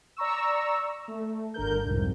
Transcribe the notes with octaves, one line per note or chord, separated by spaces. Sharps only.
D5 A#5 C#6 E6
A3
G1 D3 A#4 G6
C2 F2 G#2